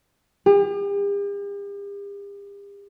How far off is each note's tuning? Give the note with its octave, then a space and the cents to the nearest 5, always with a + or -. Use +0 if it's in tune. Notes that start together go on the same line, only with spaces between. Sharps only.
G4 +45